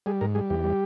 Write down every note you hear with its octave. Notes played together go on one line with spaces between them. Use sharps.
G3 G#4
G#2 A#4
G3 G#4
E2 G4
G3